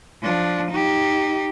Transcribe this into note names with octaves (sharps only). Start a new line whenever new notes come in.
F3 D4
D#4 G4